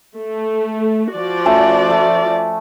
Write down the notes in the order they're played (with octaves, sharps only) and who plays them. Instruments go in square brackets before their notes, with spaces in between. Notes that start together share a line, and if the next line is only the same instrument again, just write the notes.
[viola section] A3
F3 F#4 D5
[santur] A3 C#4
A3